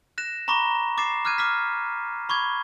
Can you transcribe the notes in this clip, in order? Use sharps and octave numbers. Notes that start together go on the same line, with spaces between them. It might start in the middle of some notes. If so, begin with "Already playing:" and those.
F#6 A#6 E7
A#5 B5 C#6 D6 A#6
D6 A6 C7 E7
D6 F6 F#6 G#6 D#7
D6 F6 B6
B5 C#6 D6 G#6